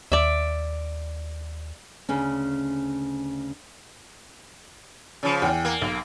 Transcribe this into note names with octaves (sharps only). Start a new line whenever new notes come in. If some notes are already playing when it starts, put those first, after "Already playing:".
D#2 D5 E5
D2 C#3 C#4
C#3 F3
E2 G5
A#3
B1